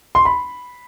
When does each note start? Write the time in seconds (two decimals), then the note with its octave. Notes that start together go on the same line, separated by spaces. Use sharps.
0.15 C6
0.25 B5